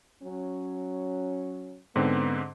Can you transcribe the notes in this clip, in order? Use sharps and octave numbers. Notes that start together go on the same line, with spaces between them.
F#3 C#4
G#2 D3 B3 C4